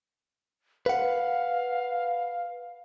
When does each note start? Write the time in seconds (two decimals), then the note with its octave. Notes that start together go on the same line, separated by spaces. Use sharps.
0.86 B4 F5 F#5